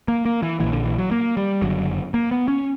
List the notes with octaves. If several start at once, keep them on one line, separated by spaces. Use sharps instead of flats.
A#3
A#3
E3
A#1 A#2 E3
D3
E3
F#3
A#3
G3
F#1 F#2 D3 F#3
A#3
B3
C#4